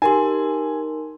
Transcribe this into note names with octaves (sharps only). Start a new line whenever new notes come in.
D#4 G4 A#4 G#5 C6